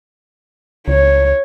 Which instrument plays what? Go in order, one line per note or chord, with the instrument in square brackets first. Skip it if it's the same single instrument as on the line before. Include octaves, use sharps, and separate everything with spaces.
[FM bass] C#2 [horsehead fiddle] C#5